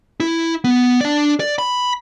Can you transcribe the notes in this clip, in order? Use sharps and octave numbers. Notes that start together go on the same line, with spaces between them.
E4
B3
D4 D5
D5
B5